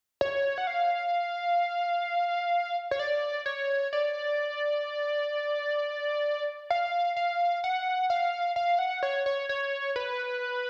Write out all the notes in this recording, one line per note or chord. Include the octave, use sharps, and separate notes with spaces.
C#5
F#5
F5
C#5
D5
C#5
D5
F5
F5
F#5
F5
F5
F#5
C#5
C#5
C#5
B4